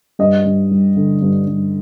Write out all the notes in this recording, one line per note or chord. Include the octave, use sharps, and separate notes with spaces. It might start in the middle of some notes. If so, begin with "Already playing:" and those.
G2 D#5
G2
G3
D3
G2
G2